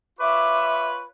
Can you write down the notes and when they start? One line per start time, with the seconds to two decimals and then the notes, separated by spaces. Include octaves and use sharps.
0.19 F4 B4 C#5 E5 C#6 D6